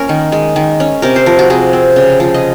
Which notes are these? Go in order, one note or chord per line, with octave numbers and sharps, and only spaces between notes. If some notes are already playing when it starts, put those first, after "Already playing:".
Already playing: A#3 C#4 A#4
D#3
G#3
D#3
C#4
C3 A#4
C5
F3 A#4
F#4
C3 G#4
C4
C#3
F3
D#5